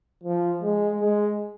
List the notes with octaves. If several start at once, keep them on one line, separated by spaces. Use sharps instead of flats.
F3
G#3
G#3